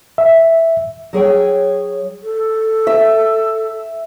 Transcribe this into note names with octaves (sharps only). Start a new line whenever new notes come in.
E5
F#3 G#4 C#5 G5
A4
E5